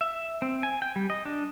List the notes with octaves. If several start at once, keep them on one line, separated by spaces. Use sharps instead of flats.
E5
C4
G#5
G5
G3
D#5
D4